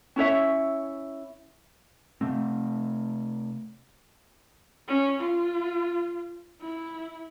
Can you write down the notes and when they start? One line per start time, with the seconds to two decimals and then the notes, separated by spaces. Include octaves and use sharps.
0.16 C#4 E4 C#5 E5
2.21 C3 A3 C4
4.88 C#4
5.20 F4
6.61 E4